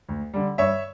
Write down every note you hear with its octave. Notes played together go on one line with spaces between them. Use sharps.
D2
D3 G3
G2 C#5 E5